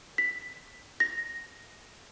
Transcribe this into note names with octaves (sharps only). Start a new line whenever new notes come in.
B6
A#6